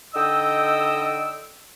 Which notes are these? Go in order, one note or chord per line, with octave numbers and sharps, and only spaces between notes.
D3 D#4 D#5 G5 E6